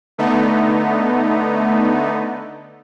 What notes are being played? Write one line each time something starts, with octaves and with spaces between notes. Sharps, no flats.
D3 A3 B3 D#4